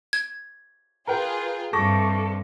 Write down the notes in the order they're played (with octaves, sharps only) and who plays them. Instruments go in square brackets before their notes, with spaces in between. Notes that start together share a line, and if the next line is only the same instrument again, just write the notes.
[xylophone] G#6
[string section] F4 G#4 [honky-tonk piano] A#4 B4 G5
[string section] G2 C3 [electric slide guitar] A4 [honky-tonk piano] C#6 D6 A#6